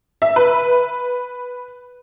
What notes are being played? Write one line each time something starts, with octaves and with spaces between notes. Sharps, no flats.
E5
B4